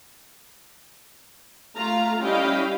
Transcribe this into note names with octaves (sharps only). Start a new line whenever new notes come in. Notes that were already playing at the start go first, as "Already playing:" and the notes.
A3 F4 F5 A#5
G3 C#4 E4 D#5 F5 G5